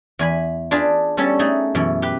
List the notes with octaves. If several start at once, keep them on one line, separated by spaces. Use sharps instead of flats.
E2 G#5 B5
D4 F4 G#4 B4 D5
G3 B3 C#4 A4 C#5
A3 D#4 G#4
F#2 B2 E3
G4 B4